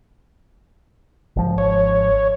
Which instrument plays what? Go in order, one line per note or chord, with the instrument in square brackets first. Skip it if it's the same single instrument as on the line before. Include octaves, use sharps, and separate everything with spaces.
[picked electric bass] G#1 F3
[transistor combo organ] C#5